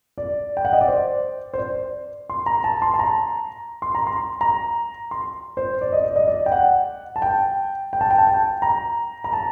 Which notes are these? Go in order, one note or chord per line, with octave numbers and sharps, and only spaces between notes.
D5
G5
F#5
D#5
D5
C5
C5
D5
C6
A#5
A5
C6
A5
A#5
C6
A#5
C6
A#5
C6
C5
D5
D#5
D5
D#5
D5
G5
F#5
A5
G5
G5
A5
G5
A5
G5
A#5
A#5
A5